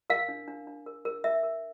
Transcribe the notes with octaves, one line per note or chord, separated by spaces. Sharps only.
A#4 F5
D4
D4
D4
A#4
A#4
A#4 E5
A#4